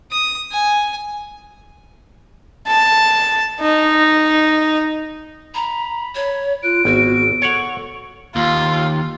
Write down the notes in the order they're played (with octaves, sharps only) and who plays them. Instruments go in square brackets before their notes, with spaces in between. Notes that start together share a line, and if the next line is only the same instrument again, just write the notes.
[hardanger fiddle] D#6
G#5
[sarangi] A5
D#4
[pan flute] A#5 [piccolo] B5
[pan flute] C#5
[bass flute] F4 [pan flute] F#6 [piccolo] D7
[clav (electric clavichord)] G#1 [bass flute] B3 [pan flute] F#4
[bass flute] A4 [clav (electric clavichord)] C#5 F#5 [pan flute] C#6
[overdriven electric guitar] D#2 [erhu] F4